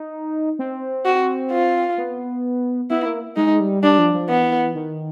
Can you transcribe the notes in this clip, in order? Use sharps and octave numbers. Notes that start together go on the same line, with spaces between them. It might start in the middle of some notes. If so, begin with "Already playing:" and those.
Already playing: D#4
C4
F#4
F4
B3
B3 E4
A#3
G#3 D#4
G3
G3 D4
F3
F3
E3 B3
D#3